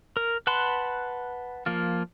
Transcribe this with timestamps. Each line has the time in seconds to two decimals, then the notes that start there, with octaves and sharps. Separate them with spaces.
0.17 A#4
0.47 B4 F#5 A5 B5 C6
1.66 F3 A#3 F4